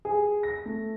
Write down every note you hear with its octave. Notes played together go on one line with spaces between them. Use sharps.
G#4
A#6
A3